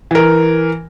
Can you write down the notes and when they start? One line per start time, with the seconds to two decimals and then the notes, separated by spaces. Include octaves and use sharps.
0.11 E3 A#4